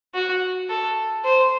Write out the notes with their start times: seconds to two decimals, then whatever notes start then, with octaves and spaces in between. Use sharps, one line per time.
0.14 F#4
0.69 A4
1.24 C5